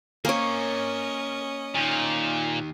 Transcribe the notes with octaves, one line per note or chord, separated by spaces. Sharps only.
A#3 C#4 A#4 C#5 D#5 G#5
D#2 A#2 D#4